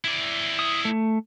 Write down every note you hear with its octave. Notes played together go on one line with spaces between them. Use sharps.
E4 D5
D#6
A3